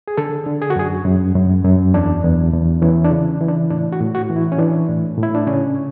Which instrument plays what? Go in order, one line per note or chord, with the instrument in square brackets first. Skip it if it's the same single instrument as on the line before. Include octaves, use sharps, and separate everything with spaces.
[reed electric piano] G#4
D3 A4
D3
G#4
F#4
F#2 G#4
F#2
F#2
F#2
E2 D4
E2
E2
E3 C#4
D4
C#3
E3
D4
A2 D4
F#4
A2
F#4
E3
E4
C#4
E3 D4
A2
A2
E4
D4
C#3 C#4